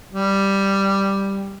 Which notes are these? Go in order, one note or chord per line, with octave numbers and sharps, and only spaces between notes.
G3